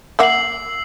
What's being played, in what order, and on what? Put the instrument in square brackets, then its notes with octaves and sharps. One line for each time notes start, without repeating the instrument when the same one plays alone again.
[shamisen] A#3 E5 F#5 [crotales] E6 C7 F#7